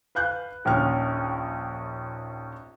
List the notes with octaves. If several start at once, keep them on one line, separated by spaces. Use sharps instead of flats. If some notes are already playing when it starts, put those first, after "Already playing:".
B4 F5 F#6 G6
A#1 D#2 C#4 F6